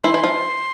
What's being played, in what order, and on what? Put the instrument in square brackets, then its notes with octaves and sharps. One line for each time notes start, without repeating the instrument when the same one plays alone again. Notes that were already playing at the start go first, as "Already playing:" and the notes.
[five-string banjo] E3 E4 [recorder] C6
[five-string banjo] E3 E4
F3 F4